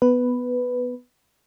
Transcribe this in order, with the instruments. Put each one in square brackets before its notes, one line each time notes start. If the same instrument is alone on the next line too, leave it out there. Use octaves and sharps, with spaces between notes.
[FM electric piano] B3 B4